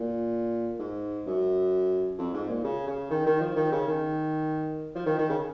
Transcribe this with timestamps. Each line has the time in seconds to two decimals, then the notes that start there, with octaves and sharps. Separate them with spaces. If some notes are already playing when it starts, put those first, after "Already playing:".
Already playing: A#2
0.79 G#2
1.27 F#2
2.18 F2
2.34 G#2
2.49 A#2
2.64 C#3
2.87 C#3
3.10 D#3
3.26 D#3
3.41 F3
3.56 D#3
3.72 C#3
3.87 D#3
4.95 F3
5.06 D#3
5.18 D#3
5.29 C#3